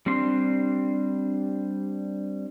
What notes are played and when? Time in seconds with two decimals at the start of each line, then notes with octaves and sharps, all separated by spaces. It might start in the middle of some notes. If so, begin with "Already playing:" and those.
0.06 G3 C4 D4 C6